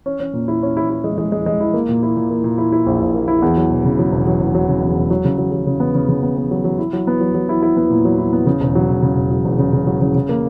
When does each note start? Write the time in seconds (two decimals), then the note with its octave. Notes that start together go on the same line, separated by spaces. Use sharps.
0.06 C#4
0.20 C#4
0.33 A#2
0.48 E4
0.63 C#4
0.77 E4
0.90 E4
1.04 G#3
1.18 G#3
1.32 G#3
1.46 G#3
1.60 E4
1.74 A#3
1.89 A#2
2.03 E4
2.17 A#2
2.30 A#3
2.44 A#2
2.58 E4
2.72 E4
2.86 A#1
3.01 A#1
3.15 A#3
3.28 E4
3.42 E2
3.57 F#3
3.71 E1
3.85 C#3
3.99 F#3
4.12 E1
4.27 F#3
4.41 E1
4.55 F#3
4.68 C#3
4.82 E2
4.97 E1
5.10 F#3
5.25 C#3
5.38 F#3
5.52 F#3
5.66 C#3
5.80 B3
5.95 C#3
6.08 C#3
6.23 B3
6.37 B3
6.51 F#3
6.64 F#3
6.78 E4
6.93 F#3
7.07 B3
7.21 F#3
7.34 F#3
7.49 E4
7.62 E4
7.77 B3
7.90 A#2
8.05 F#3
8.18 E4
8.33 B3
8.46 C#3
8.61 E1
8.75 F#3
8.89 E1
9.02 C#3
9.17 E1
9.31 F#3
9.45 E1
9.59 C#3
9.73 C#3
9.87 F#3
10.01 C#3
10.15 C#3
10.29 A#3